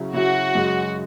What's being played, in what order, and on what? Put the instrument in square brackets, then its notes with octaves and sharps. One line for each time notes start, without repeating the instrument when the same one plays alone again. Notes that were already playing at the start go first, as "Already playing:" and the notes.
Already playing: [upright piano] C#3 F#3 C#4 E4
[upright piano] C#3 F#3 C#4 E4 [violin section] F#4
[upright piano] F#2 C#3 G#3